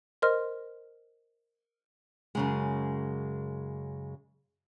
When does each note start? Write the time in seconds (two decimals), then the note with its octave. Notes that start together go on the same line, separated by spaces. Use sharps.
0.22 A#4 C5 D#5 C6 F6
2.35 F#2 C#3 G#3